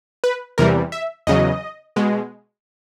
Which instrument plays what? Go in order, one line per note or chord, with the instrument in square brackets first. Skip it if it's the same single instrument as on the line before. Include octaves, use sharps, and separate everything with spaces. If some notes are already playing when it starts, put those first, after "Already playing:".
[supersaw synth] B4
E2 C3 E3 G3 A#4
E5
E2 C#3 F#3 D#5
B2 G#3